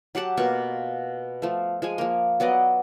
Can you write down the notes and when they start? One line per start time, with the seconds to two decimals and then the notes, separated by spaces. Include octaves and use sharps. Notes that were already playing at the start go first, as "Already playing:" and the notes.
0.15 F#3 G4 F#5 A5
0.37 B2 A#3 F4 C#6
1.42 F3 A3
1.82 F3 G#3 G#5
1.98 F3 A#3
2.40 F#3 B3 D5 D#5